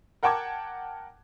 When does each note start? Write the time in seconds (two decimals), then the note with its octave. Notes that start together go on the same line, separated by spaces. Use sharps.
0.23 A#4 F#5 G5 A5 D6 G#6